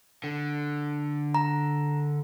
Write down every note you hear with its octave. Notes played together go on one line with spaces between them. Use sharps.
D3
A#5